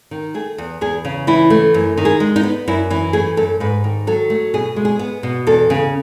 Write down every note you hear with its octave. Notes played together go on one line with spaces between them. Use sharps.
D#3
A3 G#4
E2
E2 G#4
C#3
E3 E4
A3
F#2
D#3
G#4
G#3
D#4
B3
F#2 E4
E3 E4
A3 G#4
F#2 A4
G#2 B4
D#3
F#3 A4
A3
B2 G#4
G#3
G#4
B3
B2
E2 A4
C#3